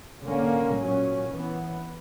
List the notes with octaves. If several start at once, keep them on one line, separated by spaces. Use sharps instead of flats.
D3 A#3 C#4
A#2 F#3 C#4
E3 B3